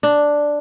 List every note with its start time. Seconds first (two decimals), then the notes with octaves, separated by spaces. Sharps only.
0.03 D4